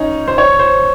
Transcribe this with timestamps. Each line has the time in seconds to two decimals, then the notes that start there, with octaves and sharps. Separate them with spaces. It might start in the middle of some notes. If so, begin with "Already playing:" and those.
Already playing: C#4 D#4
0.28 C5
0.38 C#5
0.59 C5